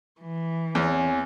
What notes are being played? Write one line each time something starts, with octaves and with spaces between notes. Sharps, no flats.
E3
E2 C4 C#5 G#5